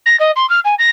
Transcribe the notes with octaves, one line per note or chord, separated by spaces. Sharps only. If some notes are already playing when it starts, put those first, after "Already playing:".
A#6
D#5
C6
F6
G#5
A#6